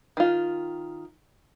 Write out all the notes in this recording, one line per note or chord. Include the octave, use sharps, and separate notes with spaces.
D#3 F4